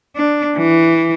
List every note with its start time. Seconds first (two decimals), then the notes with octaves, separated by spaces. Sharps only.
0.16 D4
0.57 E3